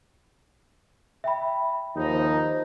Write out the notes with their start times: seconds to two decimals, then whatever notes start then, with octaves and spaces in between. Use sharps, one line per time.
1.24 E5 G5 B5
1.96 D#2 F3 D#4